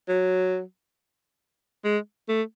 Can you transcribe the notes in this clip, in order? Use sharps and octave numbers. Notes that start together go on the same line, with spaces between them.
F#3
G#3
A3